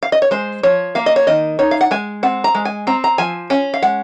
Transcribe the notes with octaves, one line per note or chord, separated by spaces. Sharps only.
F5
D#5
C#5
G#3 C5
F3 C#5
A#3 F5
D#5
C#5
D#3 D#5
D#4 C#5
F5
F#5
G#3 G#5
C4 F#5
A#5
G#3
G#5
C4 A#5
A#5
F3 G#5
C#4 G#5
F5
G#3 F#5